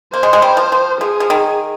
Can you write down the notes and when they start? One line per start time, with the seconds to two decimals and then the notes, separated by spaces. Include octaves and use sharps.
0.13 A#3 C5
0.23 G#3
0.33 G#3
0.42 G3
0.57 F3
0.72 F3
1.01 F3 G#4
1.20 F3
1.30 D#3